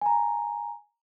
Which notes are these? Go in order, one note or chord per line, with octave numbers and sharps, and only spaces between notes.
G#5 A#5